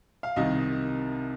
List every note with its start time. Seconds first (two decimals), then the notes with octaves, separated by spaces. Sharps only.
0.23 F5
0.36 C2 C3 D#3 D#5